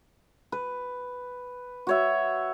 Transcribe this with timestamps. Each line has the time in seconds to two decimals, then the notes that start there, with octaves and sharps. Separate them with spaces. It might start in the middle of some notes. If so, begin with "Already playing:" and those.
0.52 B4
1.87 F#4 C#5 E5